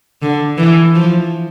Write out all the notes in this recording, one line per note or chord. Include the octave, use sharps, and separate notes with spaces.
D3
E3
F3